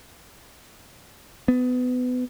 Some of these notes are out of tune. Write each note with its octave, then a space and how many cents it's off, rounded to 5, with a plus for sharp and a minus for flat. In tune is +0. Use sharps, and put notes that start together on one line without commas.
B3 +25